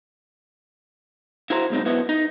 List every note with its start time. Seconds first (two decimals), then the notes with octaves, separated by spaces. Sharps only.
1.50 E4 F#4 C5 A#5
1.70 B1 G#3 C4 D#4
1.85 B1 B3 E4 F#4 D#5
2.09 D#4